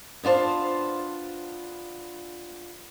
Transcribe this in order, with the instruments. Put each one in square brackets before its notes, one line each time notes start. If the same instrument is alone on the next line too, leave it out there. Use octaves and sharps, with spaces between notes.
[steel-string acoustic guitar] B3 D4 F4 C5 A5